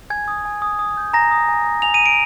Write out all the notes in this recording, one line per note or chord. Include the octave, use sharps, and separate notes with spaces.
G#5 G#6
D#6
G#5
D#6
D#6
G6
G#5 A#5 A#6
D#6
G#5
D#6
G#5 F7
D#7
G#5
D7